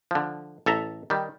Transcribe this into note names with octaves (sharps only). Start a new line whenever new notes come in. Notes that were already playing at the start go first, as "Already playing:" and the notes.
D3 F3
A1 A4 E5 A#5
D#3 G3